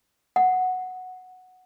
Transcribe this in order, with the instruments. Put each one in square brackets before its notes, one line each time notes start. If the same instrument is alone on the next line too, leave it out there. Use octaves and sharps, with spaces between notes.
[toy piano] F#5